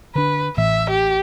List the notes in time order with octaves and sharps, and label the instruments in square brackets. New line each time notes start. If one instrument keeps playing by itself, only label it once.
[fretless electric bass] D3 D4 [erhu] B4
[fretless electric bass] A1 A2 E3 [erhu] E5
[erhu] G4